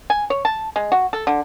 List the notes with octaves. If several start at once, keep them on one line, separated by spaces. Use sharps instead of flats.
G#5
C#5
A5
G#3
F#4
A4
D3